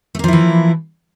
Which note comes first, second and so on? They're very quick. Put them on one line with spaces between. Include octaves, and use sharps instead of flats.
A3 A#3 F3 E4 E3